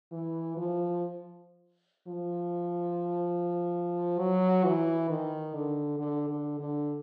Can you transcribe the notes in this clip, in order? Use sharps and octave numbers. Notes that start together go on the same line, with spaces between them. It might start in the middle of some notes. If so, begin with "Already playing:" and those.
E3
F3
F3
F#3
E3
D#3
D3
D3
D3
D3